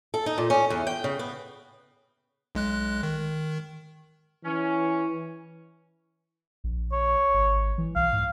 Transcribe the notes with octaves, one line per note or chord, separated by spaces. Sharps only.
A4
D#4
A#2
C#4
E2
G5
C#3
B3
B1 G#3 F#6
D#3
E3 C#4
A#1
C#5
G#1
E3
B1 F5
G#2